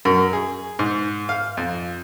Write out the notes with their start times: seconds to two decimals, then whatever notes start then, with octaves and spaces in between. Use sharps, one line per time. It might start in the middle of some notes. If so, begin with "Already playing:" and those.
0.05 F#2
0.33 G#4
0.79 G#2
1.29 F5
1.57 F2